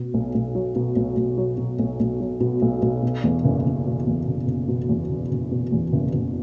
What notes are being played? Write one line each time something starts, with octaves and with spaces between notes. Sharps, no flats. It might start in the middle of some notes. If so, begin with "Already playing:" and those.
Already playing: B2
B1
B1
F#3
B2
B1
B1
F#3
B2
B1
B1
F#3
B2
B1
B1
B2
E2
F#1
F#1
B2
E2
F#1
F#1
B2
E2
F#1
F#1
B2
E2
F#1
F#1